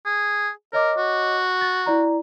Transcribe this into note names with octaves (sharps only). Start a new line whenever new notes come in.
G#4
A#4 C#5 D#5 D6
F#4
A6
E4 D5 A#5